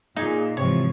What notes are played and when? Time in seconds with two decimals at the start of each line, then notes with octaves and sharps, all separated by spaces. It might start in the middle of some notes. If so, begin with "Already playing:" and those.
0.16 A#2 D#4 G#4
0.57 G#2 C3 E3 F3 C#5